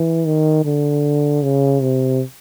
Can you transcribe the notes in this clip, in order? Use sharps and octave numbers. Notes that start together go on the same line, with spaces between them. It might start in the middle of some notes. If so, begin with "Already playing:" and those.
Already playing: E3
D#3
D3
C#3
C3